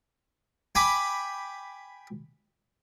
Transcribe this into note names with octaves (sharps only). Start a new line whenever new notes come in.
G5 G#5 B5 D6